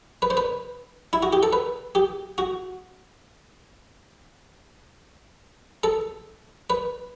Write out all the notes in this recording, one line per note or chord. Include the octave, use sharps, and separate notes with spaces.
B4
C5
B4
E4
F#4
G4
A4
B4
G4
F#4
A4
B4